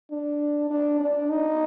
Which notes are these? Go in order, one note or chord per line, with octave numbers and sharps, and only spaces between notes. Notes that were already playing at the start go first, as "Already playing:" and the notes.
D4
D4
D4
D#4